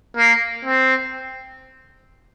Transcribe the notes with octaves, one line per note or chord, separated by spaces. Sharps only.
A#3
C4